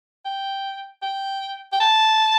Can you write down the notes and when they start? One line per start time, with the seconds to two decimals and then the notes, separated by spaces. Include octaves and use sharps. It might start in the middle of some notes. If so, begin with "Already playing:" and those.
0.25 G5
1.02 G5
1.72 G5
1.80 A5